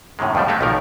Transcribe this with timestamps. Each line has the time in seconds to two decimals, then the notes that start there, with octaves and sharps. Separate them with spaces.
0.19 F#2 A2 C3 D#3 G#3
0.35 F2 D3 F3 G3 A3
0.48 D#3 G#3 A3 C4 D#4 G4
0.61 B1 A#2 D#3 F3 A#4